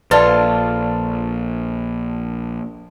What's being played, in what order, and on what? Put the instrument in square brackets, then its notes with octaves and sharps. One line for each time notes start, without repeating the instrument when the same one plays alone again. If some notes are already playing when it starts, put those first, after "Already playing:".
[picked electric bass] A#1 [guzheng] F4 A4 C6 [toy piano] B4 D5 [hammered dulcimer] A5